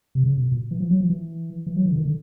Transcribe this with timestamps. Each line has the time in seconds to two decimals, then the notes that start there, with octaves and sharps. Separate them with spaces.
0.15 C3
0.24 C#3
0.38 B2
0.52 A#2
0.71 E3
0.80 F3
0.91 F#3
1.01 F3
1.10 E3
1.67 E3
1.76 F#3
1.86 E3
1.91 D3
1.96 D#3
2.06 D3